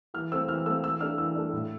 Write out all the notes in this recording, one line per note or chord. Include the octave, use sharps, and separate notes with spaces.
E3 F6
A3 C4 E6
E3 F6
A3 C4 E6
E3 E6
A3 D4 F6
E3 E6
A3 D4
A2